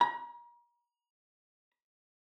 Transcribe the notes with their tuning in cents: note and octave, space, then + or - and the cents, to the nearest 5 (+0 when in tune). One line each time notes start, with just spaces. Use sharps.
A#5 +40